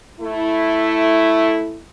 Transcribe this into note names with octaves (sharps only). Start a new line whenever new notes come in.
A3 E4